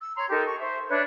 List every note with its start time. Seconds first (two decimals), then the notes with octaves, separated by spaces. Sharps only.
0.02 E6
0.16 C#5 A#5 C6
0.29 D#4 G4 A4 A#4
0.45 C#6
0.60 C5 E5
0.88 D4 B4 C#5 E5